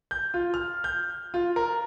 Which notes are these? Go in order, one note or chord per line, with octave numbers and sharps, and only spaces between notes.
G6
F4
F6
G6
F4
A#4